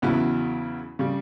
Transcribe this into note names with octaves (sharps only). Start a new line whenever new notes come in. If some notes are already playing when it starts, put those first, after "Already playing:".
E2 C#3 F#3 B3 E4
C#3 G3